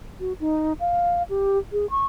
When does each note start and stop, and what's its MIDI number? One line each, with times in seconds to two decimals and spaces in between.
0.20 0.33 66
0.40 0.73 63
0.80 1.23 77
1.30 1.58 67
1.73 1.89 68
1.90 2.06 85